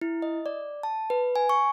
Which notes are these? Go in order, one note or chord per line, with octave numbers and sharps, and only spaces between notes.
E4
D#5
D5
A5
B4
G#5
C#6